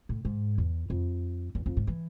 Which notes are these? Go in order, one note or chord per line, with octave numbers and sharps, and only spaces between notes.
A2
G#2
E2
F2
E2
F2
G#2
E3